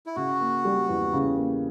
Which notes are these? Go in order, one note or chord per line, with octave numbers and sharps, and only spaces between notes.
E4
C#3 F#4
A#3
G3
E2
C#3
A#3